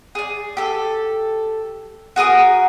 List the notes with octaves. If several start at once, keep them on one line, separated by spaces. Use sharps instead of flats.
G#4 D5
G4 A4
F#4 G#4 A#4 D#6